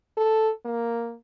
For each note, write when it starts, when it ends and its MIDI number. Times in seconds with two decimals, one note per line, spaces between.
0.17 0.50 69
0.65 1.14 58